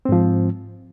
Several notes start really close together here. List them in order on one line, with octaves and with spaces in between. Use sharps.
C4 G#2 F3